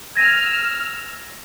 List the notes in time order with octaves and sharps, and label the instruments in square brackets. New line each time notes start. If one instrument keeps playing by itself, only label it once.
[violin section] E6 F6 [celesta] G#6 A#6 D#7